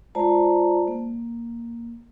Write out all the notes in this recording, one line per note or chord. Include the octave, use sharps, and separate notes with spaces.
G#3 F4 C5 D5 A5 A#5
A#3